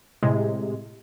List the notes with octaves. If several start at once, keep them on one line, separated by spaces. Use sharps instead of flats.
A2 C3 G#3